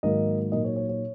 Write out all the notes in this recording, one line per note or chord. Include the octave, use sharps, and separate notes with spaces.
G#2 D#3 F#3 A#3 D#4 A#4 D#5
A#2 F#3 A#3 D#4 A#4 D#5
C#5
C#5
C#5